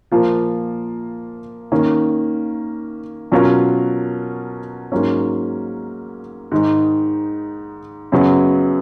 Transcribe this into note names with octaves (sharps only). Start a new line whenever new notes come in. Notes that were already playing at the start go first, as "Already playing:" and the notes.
A#2 F3 A#3 F4
D#3 A#3 C#4
B2 F#3 C#4 F4 A#4
G#2 F#3 A#3 C#4
G#2 D#3 G#3 D#4
F#2 C#3 F#3 B3